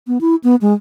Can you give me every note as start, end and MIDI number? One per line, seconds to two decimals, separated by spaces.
0.07 0.18 59
0.21 0.35 64
0.44 0.56 59
0.61 0.73 56